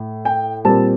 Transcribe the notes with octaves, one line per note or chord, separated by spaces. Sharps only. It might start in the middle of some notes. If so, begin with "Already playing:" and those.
Already playing: A2
G5
A#2 G3 C4 A5